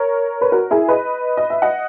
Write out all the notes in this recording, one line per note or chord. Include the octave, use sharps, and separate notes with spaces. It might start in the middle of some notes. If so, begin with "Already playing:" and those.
Already playing: A#4 C#5
B4
F#4 A#4
E4 G#4
B4 D#5
D#5
E5
D#5 F#5